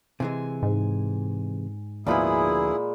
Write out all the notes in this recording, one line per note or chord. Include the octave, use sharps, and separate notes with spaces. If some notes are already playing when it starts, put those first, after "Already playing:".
C3 E3 G#3 G#5
G#2
D2 A#2 F3 G#3 B3 E4 G#4 B5